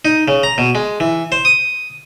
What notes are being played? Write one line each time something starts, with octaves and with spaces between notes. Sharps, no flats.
D#4
C#3
A#5
B2
G#3
E3
C5
D#6